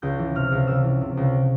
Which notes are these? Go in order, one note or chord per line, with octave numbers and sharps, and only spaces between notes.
C#2 G6
E3
C3 F6
C#2
C#2 E6
E3
C3
C#2